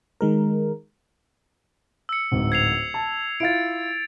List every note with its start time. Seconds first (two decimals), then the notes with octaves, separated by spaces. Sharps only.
0.21 D#3 G#3 A#4
2.09 E6 C#7
2.31 D1 G#2
2.52 G#6 C7 F7
2.94 A5
3.40 E4 F4 A6 D7